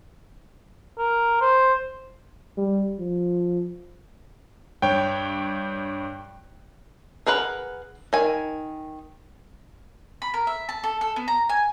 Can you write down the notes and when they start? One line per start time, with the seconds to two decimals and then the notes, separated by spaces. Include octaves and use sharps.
0.98 A#4
1.41 C5
2.57 G3
2.99 F3
4.82 G2 C#5 G5
7.26 G#4 A#4 B4 F#5
8.13 D#3 G#5
10.22 B5
10.34 A#4
10.47 E5
10.69 A5
10.84 A4
11.01 A4
11.16 B3
11.28 A#5
11.49 G#5